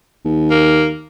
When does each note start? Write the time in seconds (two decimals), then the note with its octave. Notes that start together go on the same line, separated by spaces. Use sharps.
0.25 D#2
0.51 A#3